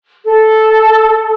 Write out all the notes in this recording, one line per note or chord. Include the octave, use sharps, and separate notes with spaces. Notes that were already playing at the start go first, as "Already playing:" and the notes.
A4